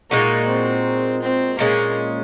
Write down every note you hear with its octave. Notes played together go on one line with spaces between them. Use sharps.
A#2 G#3 A#3 D#4 F#4
C4
C4
A#2 G#3 A#3 C#4